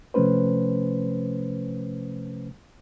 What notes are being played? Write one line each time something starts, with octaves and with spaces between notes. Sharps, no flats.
C3 F3 A3 C#4 B4 C5